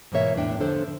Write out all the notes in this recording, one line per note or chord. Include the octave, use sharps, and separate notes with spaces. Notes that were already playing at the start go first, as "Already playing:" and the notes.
G#2 B2 E3 A#3 C#5 E5
E2 A2 A3 D4 G5
D3 F3 D4 A4 C5